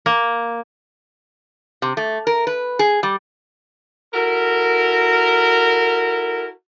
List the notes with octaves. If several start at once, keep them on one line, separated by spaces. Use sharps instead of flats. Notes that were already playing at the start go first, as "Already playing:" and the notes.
A#3
C3
A3
A#4
B4
G#4
G3
E4 F#4 A4 A#4